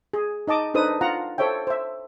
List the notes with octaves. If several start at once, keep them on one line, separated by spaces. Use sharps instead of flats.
G#4
D#4 D#5 A5 D6
D4 D#4 A4 B4 C5 D#6
F4 F#5 A#5
A4 C5 C#5 E5 G5
C5 E5